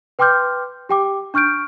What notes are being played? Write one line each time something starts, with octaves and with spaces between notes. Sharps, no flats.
B4 G5 C6 D6 F6 G6
G4 G5 D6
D4 C#6 F6 G6 D7